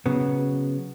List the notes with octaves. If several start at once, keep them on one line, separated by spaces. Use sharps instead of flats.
C#3 F#3 B3